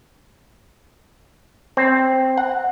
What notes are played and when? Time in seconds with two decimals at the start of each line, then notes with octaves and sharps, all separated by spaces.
1.77 C4
2.38 F#5